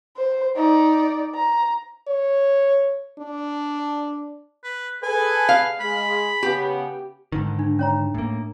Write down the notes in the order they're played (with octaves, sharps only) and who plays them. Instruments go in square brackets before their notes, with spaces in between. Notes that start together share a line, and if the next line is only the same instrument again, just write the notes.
[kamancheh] C5
D#4 D5
A#5
[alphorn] C#5
D4
[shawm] B4
[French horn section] G#4 A4 B4 [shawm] G#5
[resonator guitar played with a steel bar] F5
[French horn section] G#3 G#4 [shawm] B5
[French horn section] C#3 B3 [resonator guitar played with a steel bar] G4
[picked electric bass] G#2 D3 D#3
[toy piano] D4
C#4 C#5 A#5
[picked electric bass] A2 A#3